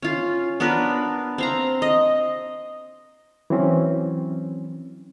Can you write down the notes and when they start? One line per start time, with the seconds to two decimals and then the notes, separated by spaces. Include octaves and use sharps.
0.02 C#4 F4
0.60 B3 D4 A#4 B4
1.38 C4 F5 A#5
1.82 D#5
3.50 E3 F#3 C4 C#4